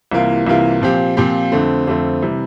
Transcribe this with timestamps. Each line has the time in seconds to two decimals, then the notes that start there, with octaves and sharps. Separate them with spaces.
0.12 C2 C3 E3 A#3 F4
0.47 C2 C3 E3 A#3 F4
0.82 A#2 F3 C4 G4
1.17 A#2 F3 C4 G4
1.52 F2 D3 A3 C4
1.87 F2 D3 A3 C4
2.22 C3 E3 G3